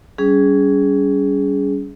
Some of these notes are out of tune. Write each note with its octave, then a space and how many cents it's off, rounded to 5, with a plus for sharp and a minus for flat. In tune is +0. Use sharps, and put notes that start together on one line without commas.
G3 -15 C#4 +25 G#4 +0